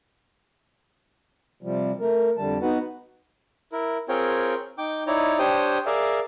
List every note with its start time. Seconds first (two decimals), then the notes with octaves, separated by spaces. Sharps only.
1.63 C3 F3 G3
2.01 A3 A#4
2.37 F2 D3 G3 A5
2.62 B3 D#4 F#4 B4 F#5
3.72 E4 A#4
4.09 C4 F4 G#4 A#4 C#5 G5
4.78 D#4 G5 D6
5.07 D#4 E4 C#5 D5 A#5
5.39 D4 G4 C5 C#5 G5 D#6
5.86 G#4 A#4 D5 E5 F5